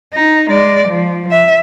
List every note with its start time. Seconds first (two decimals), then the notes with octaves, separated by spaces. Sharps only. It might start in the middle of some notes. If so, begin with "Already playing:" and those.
0.14 D#4
0.50 G#3 D5
0.88 F3
1.31 E5